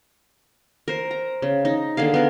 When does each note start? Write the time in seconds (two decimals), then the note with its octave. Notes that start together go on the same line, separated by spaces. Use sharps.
0.88 A#4 C5
1.11 A#5
1.42 C#3
1.65 D#4
1.97 D3 A#3 G#4 F5
2.14 B3 A#4